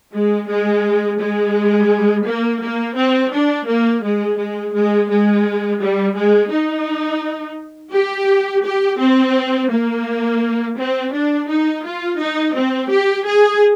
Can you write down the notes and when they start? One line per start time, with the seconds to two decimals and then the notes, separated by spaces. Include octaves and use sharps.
0.12 G#3
0.47 G#3
1.18 G#3
2.25 A#3
2.61 A#3
2.96 C4
3.32 D4
3.67 A#3
4.03 G#3
4.38 G#3
4.73 G#3
5.09 G#3
5.80 G3
6.15 G#3
6.52 D#4
7.93 G4
8.64 G4
8.99 C4
9.70 A#3
10.77 C4
11.12 D4
11.48 D#4
11.84 F4
12.19 D#4
12.54 C4
12.90 G4
13.25 G#4